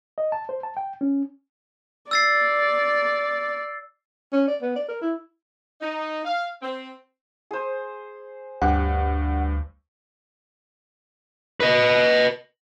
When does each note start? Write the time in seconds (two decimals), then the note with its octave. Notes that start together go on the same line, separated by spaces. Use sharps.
0.18 D#5
0.32 A5
0.49 C5
0.63 A5
0.77 G5
1.01 C#4
2.11 D5 E6 A6 C7
4.33 C#4
4.48 D5
4.62 B3
4.76 D5
4.89 A#4
5.02 E4
5.81 D#4
6.25 F5
6.62 C4
7.51 G#4 C5
8.62 D2 G2 G4 F#5
11.60 B4 D#5